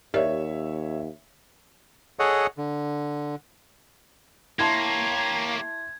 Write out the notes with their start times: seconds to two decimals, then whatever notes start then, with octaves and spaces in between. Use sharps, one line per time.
0.14 D#2 G4 A#4 C#5 D5 E5
2.19 G#4 A4 C#5 D#5 F#5
2.58 D3
4.59 A#3 E4 G4 C#5 A5 C6 G#6